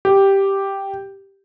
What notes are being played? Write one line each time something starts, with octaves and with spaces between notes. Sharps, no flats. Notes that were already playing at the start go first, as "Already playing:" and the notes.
G4